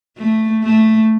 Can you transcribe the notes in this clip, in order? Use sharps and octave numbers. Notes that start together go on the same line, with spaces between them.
A3
A3